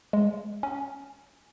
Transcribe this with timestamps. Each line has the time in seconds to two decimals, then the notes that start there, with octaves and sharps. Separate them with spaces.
0.13 G#3
0.63 C#4